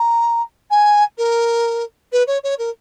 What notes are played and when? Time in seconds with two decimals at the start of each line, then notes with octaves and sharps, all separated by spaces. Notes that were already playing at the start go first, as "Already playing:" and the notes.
Already playing: A#5
0.70 G#5
1.17 A#4
2.12 B4
2.27 C#5
2.43 C#5
2.58 A#4